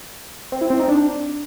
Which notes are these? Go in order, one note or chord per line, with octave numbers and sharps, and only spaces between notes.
C4
E4
C4
D#4
D4